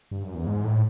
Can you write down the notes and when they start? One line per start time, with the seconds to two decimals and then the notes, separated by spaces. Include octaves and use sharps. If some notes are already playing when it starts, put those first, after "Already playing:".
0.11 G2
0.23 F#2
0.35 E2
0.47 G#2
0.64 A2